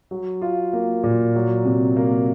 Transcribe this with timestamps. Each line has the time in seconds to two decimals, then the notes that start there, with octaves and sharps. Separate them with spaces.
0.11 F#3
0.42 F4
0.73 A#3
1.03 A#2
1.35 F#3
1.65 C3
1.96 A#3